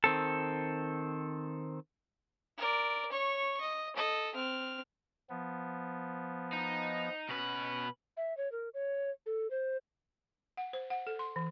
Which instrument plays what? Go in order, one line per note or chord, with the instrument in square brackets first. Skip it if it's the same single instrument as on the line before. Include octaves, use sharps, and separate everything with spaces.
[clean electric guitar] D#3 C4 A4
[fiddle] A#4 D5
C#5 C#6
D#5
A4 D#5
C4 F6
[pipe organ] F3 B3
[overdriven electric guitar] D#4
[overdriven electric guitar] B2 B4 [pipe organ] C#4
[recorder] E5
C#5
A#4
C#5
A4
C5
[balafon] F#5
C5
F#5
A4
C6
E3